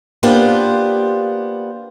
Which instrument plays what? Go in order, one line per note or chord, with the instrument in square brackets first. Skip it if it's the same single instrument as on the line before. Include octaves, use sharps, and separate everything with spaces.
[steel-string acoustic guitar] A#3 B3 D4 F4 G4 C5